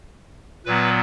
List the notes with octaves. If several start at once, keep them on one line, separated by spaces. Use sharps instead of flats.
A#2 F#3 B3 B4